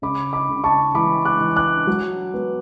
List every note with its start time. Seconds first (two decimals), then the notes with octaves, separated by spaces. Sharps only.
0.02 C#3 B5 D6
0.33 B5 D6
0.49 C#3
0.64 A5 C#6
0.94 E3 B5 D6
1.25 D6 F#6
1.41 E3
1.56 D6 F#6
1.87 F#3
2.34 B3